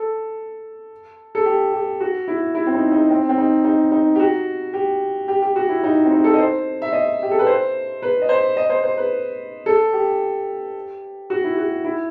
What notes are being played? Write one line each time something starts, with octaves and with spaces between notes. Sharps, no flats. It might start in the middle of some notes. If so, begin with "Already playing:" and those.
Already playing: A4
A4
G4
G4
F#4
E4
E4
C4
D#4
D#4
C4
C4
D#4
D#4
D#4
G4
F#4
G4
G4
G4
F#4
E4
D#4
C4
D#4
A4
D#5
C5
E5
D#5
G4
A4
B4
C5
B4
D#5
C5
D#5
C5
C5
B4
A4
G4
F#4
E4
F#4
E4